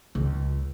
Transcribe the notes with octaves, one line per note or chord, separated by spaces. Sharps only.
C#2